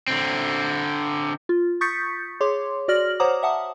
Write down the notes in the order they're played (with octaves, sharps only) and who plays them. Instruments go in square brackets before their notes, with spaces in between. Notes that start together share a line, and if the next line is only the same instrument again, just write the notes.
[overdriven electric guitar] D3 C4
[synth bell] F4
C#6 D#6 G6 A6 B6 C#7
G#4 C#5 C6 D6
F#4 D5 F6 A#6 F#7
C5 C#5 F#5 A#5 D6 D#6
E5 F#5 A5 D#6